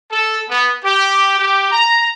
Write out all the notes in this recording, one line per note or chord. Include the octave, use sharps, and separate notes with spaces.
A4
B3
G4
G4
A#5